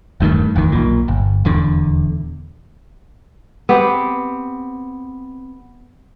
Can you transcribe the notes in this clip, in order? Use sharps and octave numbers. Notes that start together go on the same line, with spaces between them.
E1 G2 D#3 A3
F#1 E2 D#3
B1 A#2
G1
D#1 E2 D3
B3 C4 G4